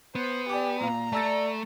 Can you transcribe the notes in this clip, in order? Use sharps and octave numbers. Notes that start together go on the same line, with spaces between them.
B3 C5
G4 D5 G#5 D6
A#2 F5 A#5
A3 D5 A5 E6 A6